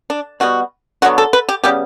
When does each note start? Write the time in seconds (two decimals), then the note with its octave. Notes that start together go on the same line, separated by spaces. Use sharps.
0.10 D4
0.40 B2 G3 B3 F#4
1.02 D3 F#3 B3 F#4
1.18 A4
1.33 B4
1.49 G4
1.64 C#3 G3 B3 G4